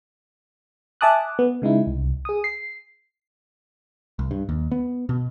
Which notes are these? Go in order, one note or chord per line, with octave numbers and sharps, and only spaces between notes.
E5 G#5 A5 D6 D#6 F#6
B3
C#3 G#3 D#4 E4
C2
G#4 D#6
C7
C2
G2
D#2
B3
B2